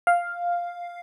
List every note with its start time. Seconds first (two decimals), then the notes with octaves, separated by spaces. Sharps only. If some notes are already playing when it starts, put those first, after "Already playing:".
0.07 F5